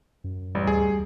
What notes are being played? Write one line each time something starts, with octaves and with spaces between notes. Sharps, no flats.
F#2
A1 G3
D2 G#4